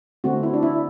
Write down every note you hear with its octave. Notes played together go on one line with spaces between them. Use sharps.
D3 A3 C4 F#4
E4
D4
E4